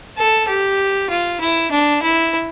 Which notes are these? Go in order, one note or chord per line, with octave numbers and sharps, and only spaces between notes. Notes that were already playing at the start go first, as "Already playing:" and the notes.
A4
G4
F4
E4
D4
E4